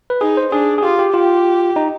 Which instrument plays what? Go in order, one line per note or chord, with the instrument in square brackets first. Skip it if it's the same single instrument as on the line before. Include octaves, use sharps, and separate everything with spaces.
[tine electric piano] B4
[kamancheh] D#4 [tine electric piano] G#4
[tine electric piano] C5
[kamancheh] D4 [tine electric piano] G#4
[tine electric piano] G#4
[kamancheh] F4 [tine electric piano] G4
[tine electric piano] G4
[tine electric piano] F4 [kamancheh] G4
[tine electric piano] D#4